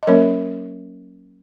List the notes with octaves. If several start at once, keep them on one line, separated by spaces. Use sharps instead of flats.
D#5
F#3 A#3 C#4 A#4 C#5